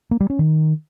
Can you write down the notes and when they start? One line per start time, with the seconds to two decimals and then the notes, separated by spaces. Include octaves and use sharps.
0.11 A#3
0.20 G3
0.30 C#4
0.39 D#3